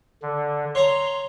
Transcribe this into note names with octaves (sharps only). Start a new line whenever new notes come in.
D3
C#5 A#5 C6